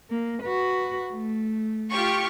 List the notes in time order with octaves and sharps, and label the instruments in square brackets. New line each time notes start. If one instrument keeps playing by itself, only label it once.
[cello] A#3
F#4 B4
A3
[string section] F4 G4 C#6